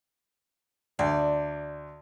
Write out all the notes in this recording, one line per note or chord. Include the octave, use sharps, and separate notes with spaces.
D2 D5